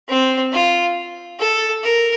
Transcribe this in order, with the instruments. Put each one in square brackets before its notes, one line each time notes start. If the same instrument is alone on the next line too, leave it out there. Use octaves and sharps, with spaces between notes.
[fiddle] C4
F4
A4
A#4